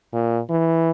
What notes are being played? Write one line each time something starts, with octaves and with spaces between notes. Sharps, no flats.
A#2
E3